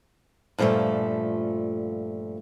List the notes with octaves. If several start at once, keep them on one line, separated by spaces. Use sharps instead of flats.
G2 A#2 F3 G#3 A3